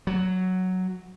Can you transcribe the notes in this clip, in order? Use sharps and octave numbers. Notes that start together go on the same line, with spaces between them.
F#3